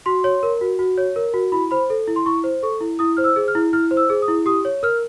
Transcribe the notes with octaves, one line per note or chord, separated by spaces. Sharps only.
F#4 C6
C#5
A#4
F#4
F#4
C#5
A#4
F#4
E4 B5
C5 B5
A4
E4
C6
E4 C#6
C5
A4 C#6
E4
E4 D#6
C5 F6
E6
G#4
F6
E4
E4 F6
C5
E6
G#4
D#6
E4
G4 D#6
C#5
A#4 F6